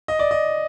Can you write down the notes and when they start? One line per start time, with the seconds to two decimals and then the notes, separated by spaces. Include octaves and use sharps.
0.08 D#5
0.19 D5
0.31 D#5